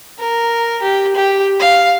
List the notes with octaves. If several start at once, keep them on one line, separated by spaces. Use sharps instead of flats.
A#4
G4
G4
F5